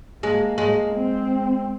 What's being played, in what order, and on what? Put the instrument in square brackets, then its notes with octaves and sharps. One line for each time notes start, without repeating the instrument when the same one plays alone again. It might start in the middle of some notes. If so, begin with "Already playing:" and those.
[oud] G#3 [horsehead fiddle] A#3
[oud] G#3
[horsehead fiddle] C4